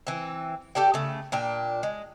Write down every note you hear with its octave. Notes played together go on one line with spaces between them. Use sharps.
E3 C4
G4 A4 D5 G5
C#3 A3
A#2 D4 G5
G#3